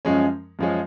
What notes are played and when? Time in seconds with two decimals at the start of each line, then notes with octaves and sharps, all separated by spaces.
0.05 F#2 F3 G#3 C#4
0.59 F#2 F3 G#3 C#4